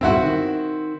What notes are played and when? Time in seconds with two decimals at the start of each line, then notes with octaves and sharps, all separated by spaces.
0.01 D1 G2 B2 C4 E4 F#4
0.21 D#3